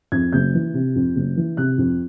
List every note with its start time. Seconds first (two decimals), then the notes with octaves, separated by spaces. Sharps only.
0.12 F2 G#6
0.33 F#1 G6
0.54 E3
0.74 C3
0.95 F2
1.16 F#1
1.37 E3
1.57 C3 F#6
1.78 F2